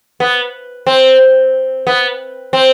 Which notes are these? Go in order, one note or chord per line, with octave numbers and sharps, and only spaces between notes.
B3
C4
B3
C4